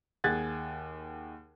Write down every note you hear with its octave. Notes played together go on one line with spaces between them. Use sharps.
D#2 G#4 F#5 F#6 G#6 A6